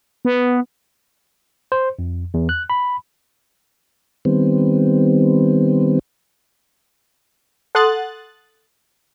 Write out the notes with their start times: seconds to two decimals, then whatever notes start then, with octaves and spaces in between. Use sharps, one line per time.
0.25 B3
1.72 C5
1.99 F2
2.34 E2
2.49 F#6
2.70 B5
4.25 D#3 G3 B3 C4
7.75 A4 F#5 C6 D#6 F#6 A6